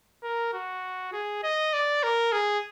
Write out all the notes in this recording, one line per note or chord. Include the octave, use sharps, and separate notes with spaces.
A#4
F#4
G#4
D#5
D5
A#4
G#4